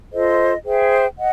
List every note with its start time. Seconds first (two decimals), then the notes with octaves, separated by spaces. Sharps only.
0.12 F4 A4 C5 D#5
0.64 G#4 C5 E5 G5
1.17 D#5 F#5